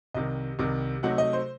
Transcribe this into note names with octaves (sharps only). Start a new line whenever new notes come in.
C2 C3 D#3 D#5
C2 C3 D#3
C3 F#3 A3 D#4 F#5
D#5
C5